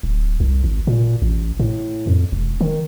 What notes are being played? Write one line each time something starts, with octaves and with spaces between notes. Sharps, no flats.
D1
C2
G#1
A#2
A1
A2
F2
E1
D#3